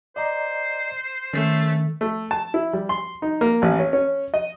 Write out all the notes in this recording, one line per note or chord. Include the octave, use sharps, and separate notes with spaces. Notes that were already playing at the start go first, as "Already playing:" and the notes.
C5 D5 D#5 A#5
D#3 A3 C#4
A3
A5
E4
G3
C6
D#4
A#3
A1
C#4
C#4
D#5